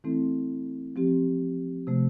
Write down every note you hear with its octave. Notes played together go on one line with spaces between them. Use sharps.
E3 A3 C4 E4 A4
F3 C4 G4
C3 F3 A3